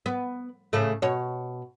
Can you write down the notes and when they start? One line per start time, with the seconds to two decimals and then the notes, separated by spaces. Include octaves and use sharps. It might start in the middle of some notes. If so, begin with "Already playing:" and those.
0.06 B3
0.73 A2 C#3 A3
1.02 B2 C#5